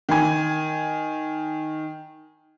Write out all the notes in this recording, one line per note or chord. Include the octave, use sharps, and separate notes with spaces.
D#3 G#5